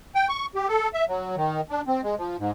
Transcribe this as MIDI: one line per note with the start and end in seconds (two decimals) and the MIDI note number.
0.15 0.27 79
0.29 0.46 85
0.55 0.68 67
0.68 0.89 69
0.94 1.05 76
1.08 1.36 54
1.36 1.61 51
1.70 1.81 62
1.87 2.01 60
2.03 2.15 56
2.18 2.37 53
2.39 2.51 44